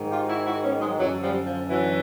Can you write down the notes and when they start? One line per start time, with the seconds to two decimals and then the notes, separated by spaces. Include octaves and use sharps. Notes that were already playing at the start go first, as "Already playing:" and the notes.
Already playing: G#2 D#3
0.10 F4 G4
0.28 E4 F#4
0.45 E4 F#4
0.63 B3 C#4
0.80 F#3 G#3
0.98 F#2 D3 E3 F#3
1.22 F3 G3
1.45 F3
1.68 E3 F#3